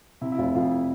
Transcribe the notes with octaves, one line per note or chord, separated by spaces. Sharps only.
C3 E4
E4
F1 F4
F2 F4
E4